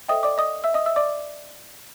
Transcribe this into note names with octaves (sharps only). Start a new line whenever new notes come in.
A4 C5 D#5 E5 G5 D#6
D5 D6
D#5 D#6
E5 E6
D#5 D#6
E5 E6
D5 D6